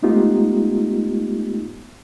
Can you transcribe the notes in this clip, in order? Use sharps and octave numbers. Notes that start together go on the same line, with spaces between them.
G#3 A3 B3 D#4 F4 G4